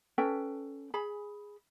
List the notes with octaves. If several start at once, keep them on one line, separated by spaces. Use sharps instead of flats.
C#4 A4 B4 G5
G#4 B5